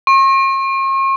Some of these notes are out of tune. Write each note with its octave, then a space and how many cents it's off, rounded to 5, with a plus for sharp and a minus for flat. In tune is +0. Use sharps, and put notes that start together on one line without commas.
C#6 -45